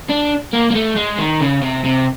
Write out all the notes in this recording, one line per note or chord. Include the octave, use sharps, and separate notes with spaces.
D4
A#3
A#3
A3
G#3
D#3
C#3
C3
C3